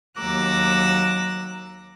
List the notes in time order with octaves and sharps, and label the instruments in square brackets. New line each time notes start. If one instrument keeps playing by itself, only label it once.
[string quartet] D#2 F#3 A#5 D6 E6 F#6